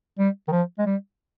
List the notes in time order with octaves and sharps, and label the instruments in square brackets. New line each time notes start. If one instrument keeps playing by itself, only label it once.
[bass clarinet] G3
D#3
F3
G#3
G3